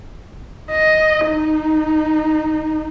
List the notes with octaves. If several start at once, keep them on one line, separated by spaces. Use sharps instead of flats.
D#5
D#4